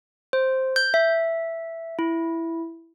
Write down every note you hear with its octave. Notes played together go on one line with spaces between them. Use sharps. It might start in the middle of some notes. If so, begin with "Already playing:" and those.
C5
G6
E5
E4